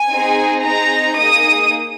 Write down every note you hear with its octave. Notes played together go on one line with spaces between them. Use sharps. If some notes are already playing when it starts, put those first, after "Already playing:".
Already playing: G#5
C4 D#4 G#4
C4 D#4 G#4 A#5
A#3 D#4 G#4 D#6